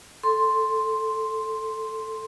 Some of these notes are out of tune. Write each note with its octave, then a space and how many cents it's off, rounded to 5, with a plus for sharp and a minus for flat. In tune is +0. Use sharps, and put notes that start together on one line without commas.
A4 +0 C6 +0